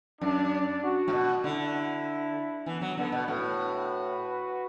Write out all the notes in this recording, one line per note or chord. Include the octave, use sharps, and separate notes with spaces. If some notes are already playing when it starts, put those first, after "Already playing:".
F#2 D4
F#4
A2
B2
D3 E4
E3 B3
F#3
D3 B3
B2
A2 F#4 B4